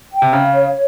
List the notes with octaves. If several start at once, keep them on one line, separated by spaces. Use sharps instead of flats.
G5
C3
C#3 F5
C#5